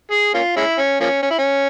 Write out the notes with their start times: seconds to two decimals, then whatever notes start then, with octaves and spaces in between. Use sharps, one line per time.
0.11 G#4
0.34 A#3 C#4 F4
0.56 G#3 C#4 E4
0.78 C#4
1.00 F3 A#3 C#4
1.22 C#4
1.30 E4
1.38 C#4